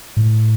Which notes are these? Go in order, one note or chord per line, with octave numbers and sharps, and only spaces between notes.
A2